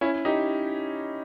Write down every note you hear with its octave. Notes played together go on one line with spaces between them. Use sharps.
C#4 E4
D#4 G4